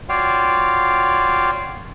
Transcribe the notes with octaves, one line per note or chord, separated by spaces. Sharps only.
F4 F#4 C#5 D5 F5 G5